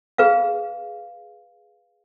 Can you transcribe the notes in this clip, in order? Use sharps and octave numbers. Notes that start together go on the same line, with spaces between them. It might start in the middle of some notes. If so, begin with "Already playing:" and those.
G#4 B4 F5